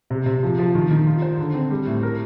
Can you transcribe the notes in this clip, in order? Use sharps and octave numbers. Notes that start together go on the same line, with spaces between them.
C3
C3
F3
F3
D#3
D#3
F4
C5
D3
C4
G3
A2
A#4